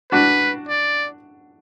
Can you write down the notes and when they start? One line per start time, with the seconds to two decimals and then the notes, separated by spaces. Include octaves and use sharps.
0.12 D4 F#4 B4
0.68 D5